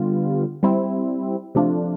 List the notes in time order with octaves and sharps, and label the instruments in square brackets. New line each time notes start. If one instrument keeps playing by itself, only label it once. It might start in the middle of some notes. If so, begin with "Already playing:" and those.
Already playing: [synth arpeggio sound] D3 G3 B3 F4
G3 C4 E4
C3 F3 A3 D4 F4